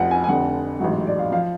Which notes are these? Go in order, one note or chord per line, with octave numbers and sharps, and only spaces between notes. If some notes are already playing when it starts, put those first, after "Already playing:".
Already playing: F1 F2 F3 F#5
G#5
G#5
F1 F2 D3 F#5
A1 G#2 F#3 F#5
D5
F5
F3 F5